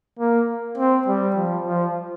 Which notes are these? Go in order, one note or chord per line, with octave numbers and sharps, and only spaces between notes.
A#3
C4
G3
F3
F3